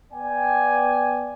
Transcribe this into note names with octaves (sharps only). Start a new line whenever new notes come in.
B3 D5 G5 G#5